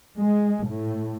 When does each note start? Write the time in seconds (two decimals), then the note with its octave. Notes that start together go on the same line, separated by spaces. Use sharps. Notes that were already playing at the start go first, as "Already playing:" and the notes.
0.19 G#3
0.68 A2